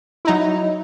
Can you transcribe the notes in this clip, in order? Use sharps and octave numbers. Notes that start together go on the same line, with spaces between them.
F#3 D#4 E4